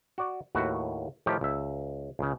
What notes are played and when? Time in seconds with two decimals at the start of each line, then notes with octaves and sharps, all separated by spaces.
0.18 F#4 D5
0.55 D#2 A2 F#4 B4
1.26 A2 D#3 F3 D#4 G4
1.41 C#2 E5
2.19 C#2 C#3